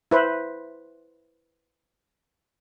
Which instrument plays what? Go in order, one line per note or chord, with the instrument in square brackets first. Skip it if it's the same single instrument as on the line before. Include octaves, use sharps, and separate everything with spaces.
[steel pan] E4 B4 C5